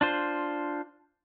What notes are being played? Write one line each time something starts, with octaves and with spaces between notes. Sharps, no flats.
D4 F4 C5